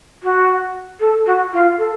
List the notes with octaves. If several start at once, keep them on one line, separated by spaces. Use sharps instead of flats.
F#4
A4
F#4
F4
A4